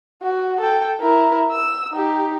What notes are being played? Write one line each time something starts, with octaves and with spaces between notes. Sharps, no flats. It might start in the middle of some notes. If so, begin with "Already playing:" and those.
F#4
A4 G5
E4 A#4
E6
D#4 G4